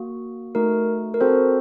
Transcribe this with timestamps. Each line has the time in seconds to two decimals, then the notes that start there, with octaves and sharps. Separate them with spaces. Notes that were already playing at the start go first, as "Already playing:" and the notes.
Already playing: A#3 F#4
0.55 A3 D#4 F#4 A#4
1.14 A#4
1.21 C4 F#4 A4 C5